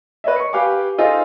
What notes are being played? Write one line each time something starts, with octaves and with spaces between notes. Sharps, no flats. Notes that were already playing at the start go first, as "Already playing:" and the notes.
B4 C#5 D#5 E5
C#6 C#7
G4 B4 F5 G#5 D6
D#4 F4 G#4 A4 C5 D#5